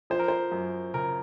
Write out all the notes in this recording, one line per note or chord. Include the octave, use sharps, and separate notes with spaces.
F3 C5
A#4
C5
F#2
C#3 A#4